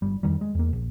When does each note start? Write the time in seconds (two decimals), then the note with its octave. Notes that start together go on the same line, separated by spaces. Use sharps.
0.02 G1 G3
0.23 F2 D#3 G3
0.41 G#3
0.55 E2 A#3
0.73 A#1